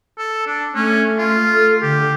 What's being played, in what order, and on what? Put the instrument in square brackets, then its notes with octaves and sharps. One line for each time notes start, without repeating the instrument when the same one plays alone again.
[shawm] A4
D4
[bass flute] A3 [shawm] C#4
[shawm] F4
[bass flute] A4
[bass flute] D3 [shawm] G4